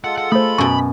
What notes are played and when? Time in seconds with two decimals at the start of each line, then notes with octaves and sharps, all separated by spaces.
0.04 G#3 F4 A4 F#5
0.18 F#5
0.32 A3 C5 B5
0.58 F#2 B2 C#6